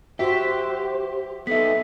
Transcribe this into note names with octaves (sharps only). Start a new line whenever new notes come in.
F#4 G4 C5 E5 B6
B3 D#4 A4 E5 B6